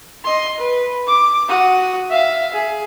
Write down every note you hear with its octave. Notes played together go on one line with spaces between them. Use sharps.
D#5 C6
B4
D6
F#4 D#6
E5 F5
G#4